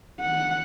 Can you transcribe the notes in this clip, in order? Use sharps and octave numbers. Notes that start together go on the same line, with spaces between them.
F#5